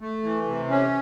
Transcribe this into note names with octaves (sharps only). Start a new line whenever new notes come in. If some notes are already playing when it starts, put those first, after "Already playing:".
A3
E3
C3
C#4